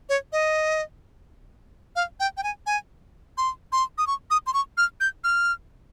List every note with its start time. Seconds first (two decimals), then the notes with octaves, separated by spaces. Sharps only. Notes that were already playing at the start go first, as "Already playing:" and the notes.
0.09 C#5
0.32 D#5
1.96 F5
2.20 G5
2.37 G5
2.43 G#5
2.66 G#5
3.37 C6
3.72 C6
3.98 D#6
4.07 C#6
4.30 D#6
4.47 C6
4.54 C#6
4.77 F6
5.00 G6
5.24 F6